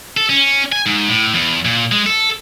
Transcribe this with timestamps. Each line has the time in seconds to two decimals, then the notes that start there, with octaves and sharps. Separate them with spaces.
0.17 A4
0.30 C#4
0.72 G#5
0.86 G#2
1.09 A2
1.34 E2
1.65 A#2
1.92 G#3
2.06 A4